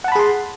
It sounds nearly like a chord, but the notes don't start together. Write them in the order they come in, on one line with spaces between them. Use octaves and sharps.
F#5 A5 B5 G#4 C6